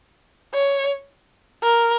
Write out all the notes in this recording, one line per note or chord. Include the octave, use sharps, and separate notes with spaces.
C#5
A#4